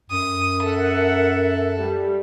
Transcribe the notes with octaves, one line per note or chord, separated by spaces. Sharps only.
F#2 D#6
A4 A#4 E5 F#5
G3